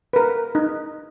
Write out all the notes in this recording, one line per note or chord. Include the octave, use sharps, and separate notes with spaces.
A#4 B4
D#4